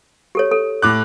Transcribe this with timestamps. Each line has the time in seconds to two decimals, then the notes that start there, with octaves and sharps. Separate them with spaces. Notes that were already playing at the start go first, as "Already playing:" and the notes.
0.35 G4 A4 C#5
0.51 A4
0.82 A2 D6 F#6